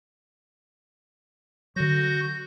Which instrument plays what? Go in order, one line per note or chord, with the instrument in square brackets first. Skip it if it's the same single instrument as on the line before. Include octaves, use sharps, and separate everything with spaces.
[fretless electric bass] D3 F#3 [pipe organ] F#4 G6 A#6